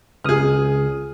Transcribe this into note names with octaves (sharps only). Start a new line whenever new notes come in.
C#2 G#4 D#6 F6